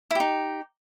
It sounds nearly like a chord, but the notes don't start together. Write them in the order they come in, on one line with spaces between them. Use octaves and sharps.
E4 G4 D#4